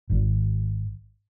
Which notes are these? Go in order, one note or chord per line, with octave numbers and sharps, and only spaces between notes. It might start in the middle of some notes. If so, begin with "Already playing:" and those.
G#1